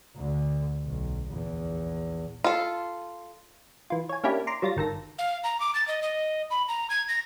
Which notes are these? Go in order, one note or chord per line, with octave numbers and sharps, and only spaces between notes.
D2 D3
B1
A#1 E2
F4 A4
E3 F4
C#5 G#5
A#3 C#4 D4 E4 G4
A#5 C6 D6
F#3 G3 F4 A6 A#6
G1 D#3 A4 A#6
F5
A#5
D6
A6
D#5
D#5
B5
A#5
G#6
A#6